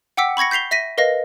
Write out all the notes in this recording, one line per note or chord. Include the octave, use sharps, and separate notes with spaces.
F#5 G5 D6 E6 B6 C#7
B5 C#6 G#6 A#6 C#7
G6 B6 C7 F7 G7
E5 A#6 B6 D#7
A#4 B4 D#5 F5 A#6